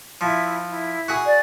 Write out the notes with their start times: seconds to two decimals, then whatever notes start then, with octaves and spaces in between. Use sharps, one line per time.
0.21 F3 E4
0.69 E4
1.08 F#4 G#4
1.25 D5